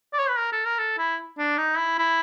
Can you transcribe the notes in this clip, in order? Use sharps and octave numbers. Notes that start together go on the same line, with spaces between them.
D5
C#5
B4
A#4
A4
A#4
A4
E4
D4
D#4
E4
E4